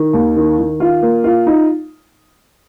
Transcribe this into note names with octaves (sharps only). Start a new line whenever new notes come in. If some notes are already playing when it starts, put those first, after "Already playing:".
Already playing: D#3
D#2
D#3
D#3
F4
A#3
F4
D#4